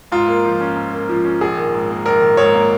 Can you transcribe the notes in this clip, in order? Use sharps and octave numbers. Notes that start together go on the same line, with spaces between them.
G#2 F4
A#3
F3
C#4
G#2
A#3
F3
C#4
A#1 G#4
D#3
G#2
A#3
A#1 A#4
D#3
G#2 C#5
A#3